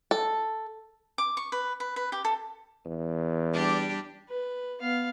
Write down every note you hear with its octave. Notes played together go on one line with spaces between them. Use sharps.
A4
D6
C#6
B4
B4
B4
G4
A4
E2
G3 D4 G4
B4
B3 F5